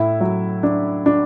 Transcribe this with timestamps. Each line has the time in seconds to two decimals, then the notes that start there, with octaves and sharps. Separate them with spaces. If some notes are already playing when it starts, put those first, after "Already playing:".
Already playing: A2 E4 E5
0.21 F#3
0.63 D4
1.06 D4